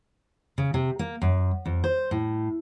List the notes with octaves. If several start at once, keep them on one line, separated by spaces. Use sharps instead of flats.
C#3
C3
A#3
F#2
F2
C5
A2